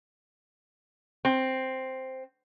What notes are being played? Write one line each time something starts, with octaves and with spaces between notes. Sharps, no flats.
C4